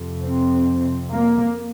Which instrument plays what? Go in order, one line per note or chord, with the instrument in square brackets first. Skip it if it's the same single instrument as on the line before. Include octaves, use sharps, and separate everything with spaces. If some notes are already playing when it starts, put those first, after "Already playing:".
Already playing: [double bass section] F2 C3
C4
A#3